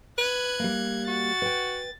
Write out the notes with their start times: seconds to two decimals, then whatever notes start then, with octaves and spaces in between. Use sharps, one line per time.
0.18 B4 F#6 G#6
0.60 G3 A#3
1.08 F#4 A6
1.42 B4 G5